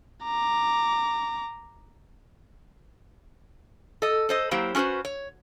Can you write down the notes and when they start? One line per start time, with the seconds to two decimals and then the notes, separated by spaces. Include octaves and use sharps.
0.23 A#5 D6
4.02 A4 D#5
4.29 A4 C5 D#5
4.51 F#3 A#3 E4 G4 C5
4.75 C#4 F#4 G#4 B4 C5
5.05 C#5